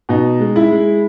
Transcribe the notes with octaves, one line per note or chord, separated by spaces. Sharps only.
B2 D#4
G#3
E4
G#3